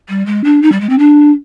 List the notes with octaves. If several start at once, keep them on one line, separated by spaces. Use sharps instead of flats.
G3
G#3
D4
D#4
G3
G#3
C4
D4